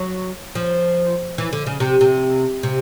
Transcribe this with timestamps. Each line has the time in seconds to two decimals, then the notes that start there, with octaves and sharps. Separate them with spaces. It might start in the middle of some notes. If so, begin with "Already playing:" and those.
Already playing: F#3
0.55 F3
1.38 E3
1.53 D3
1.66 C#3
1.80 C3
2.01 C3
2.63 C3